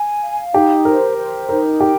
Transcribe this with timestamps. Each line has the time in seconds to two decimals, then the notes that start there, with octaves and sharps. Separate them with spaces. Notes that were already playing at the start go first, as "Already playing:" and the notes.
Already playing: G#5
0.22 F5
0.53 D#4 G4
0.85 A#4 C5
1.17 C5
1.49 D#4 A#4
1.80 G4 G5